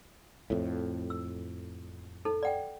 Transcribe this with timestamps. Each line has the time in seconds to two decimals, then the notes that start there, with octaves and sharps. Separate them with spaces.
0.50 F2 A2
1.10 E6
2.25 D#4 A4
2.43 D5 F#5 G5